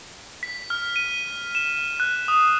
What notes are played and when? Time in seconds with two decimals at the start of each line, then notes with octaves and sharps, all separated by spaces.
0.43 B6
0.70 F6
0.96 D#7
1.55 E7
2.00 F#6
2.28 D#6